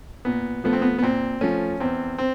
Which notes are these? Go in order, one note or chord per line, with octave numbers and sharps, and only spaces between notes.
A#2 B3
F3 A3 B3
C4
B3
B3
A#2 C4
F3 A3 C#4
E2 C4
C4